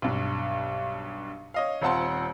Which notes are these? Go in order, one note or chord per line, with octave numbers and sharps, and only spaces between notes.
B1 G2
C#5 D#5 F5
D#1 C4 F4 F#5 A5 C6